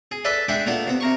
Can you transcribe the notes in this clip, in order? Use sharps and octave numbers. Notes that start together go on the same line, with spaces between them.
G#4
A4 B4 D5 E5 A5 B5
G#3 D4 E5 F#5 G5
A#2 A3 B3 D4
C3 B3
C3 A#4 C#6